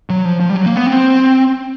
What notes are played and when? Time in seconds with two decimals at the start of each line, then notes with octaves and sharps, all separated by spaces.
0.10 F#3
0.25 F3
0.40 F3
0.50 G3
0.56 F#3
0.66 A#3
0.76 B3
0.87 C4